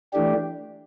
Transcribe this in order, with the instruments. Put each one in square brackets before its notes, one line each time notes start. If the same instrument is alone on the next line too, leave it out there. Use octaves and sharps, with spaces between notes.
[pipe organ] E3 A3 D4 G4